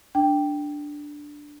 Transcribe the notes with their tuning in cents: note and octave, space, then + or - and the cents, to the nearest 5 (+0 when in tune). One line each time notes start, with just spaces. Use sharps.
D4 +0 G5 +0